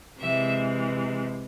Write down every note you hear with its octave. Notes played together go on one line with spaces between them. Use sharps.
C3 E3 G#3 E5